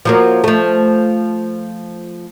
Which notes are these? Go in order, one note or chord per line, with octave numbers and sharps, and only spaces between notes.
F3 F#3 A#3
F3 A3